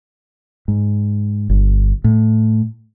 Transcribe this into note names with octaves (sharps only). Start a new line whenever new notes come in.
G#2
G1
A2